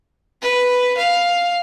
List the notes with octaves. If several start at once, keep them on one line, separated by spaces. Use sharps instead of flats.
B4
F5